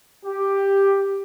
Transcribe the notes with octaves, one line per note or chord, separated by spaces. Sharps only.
G4